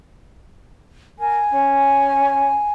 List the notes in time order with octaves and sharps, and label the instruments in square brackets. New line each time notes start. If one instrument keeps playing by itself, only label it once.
[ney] A#4 [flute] G#5
[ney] C#4